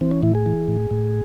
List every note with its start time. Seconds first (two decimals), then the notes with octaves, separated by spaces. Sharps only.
0.01 E3 C4
0.11 C#4
0.23 A2 E4
0.35 G#4
0.46 E3
0.68 A2
0.91 A2